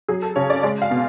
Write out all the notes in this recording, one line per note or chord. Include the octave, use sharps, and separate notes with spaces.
F#3 G#4
A4
C#3 C#5
D5
G#3 D5
F5
B2